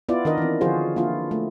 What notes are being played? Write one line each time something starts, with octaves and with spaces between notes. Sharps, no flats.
B3 E4 F4 D5
D#3 D4 A#4 D#5
E3 C4
D3 F3 F4 F#4 G#4 C5
A#3 D4 E4 F4
A3